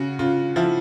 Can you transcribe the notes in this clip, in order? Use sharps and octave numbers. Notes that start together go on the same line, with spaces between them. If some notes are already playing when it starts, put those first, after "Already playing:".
Already playing: C#3 F#4
C#3 F4
F3 E4